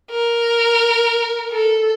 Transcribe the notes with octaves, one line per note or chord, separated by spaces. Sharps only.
A#4
A4